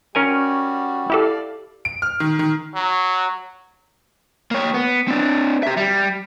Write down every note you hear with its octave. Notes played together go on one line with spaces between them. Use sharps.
G3 C#4 F#4 A#4 G#5
E4 G4 A4 D5 F5
D7
F6
D#3
D#3
F#3
A#3 C#5
B3
C4 D4
G4 E5
G3